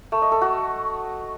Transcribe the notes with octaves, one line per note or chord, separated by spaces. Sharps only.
A3
D#5
A4
F#4